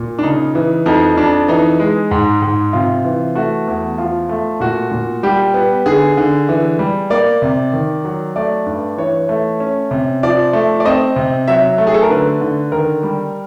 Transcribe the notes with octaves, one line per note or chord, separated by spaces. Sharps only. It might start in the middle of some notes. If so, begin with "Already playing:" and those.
Already playing: A#2
D4
C#3 D#4
E3
F2 D#4
F2 D4
E3 D#4
G#3
G#2
G#2
C3 F4
E3
A3 F#4
E2
F3 F4
A3
A#2 F#4
A#2
G3 G4
B3
D3 G#4
D3
E3
G3
A#3 D5
C3
D#3
F#3
A3 D5
G2
E3 C#5
A3
C#4
C3
F3 D5
A3
D5
C4 D#5
C3
F#3 E5
A3
G#4
A4
A#4
D3 B4
D3
D#3 A#4
G3